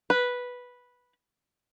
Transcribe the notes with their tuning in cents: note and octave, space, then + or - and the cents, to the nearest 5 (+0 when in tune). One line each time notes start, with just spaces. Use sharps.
B4 -5